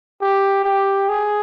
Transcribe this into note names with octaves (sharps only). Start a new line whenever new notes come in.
G4
G4
G#4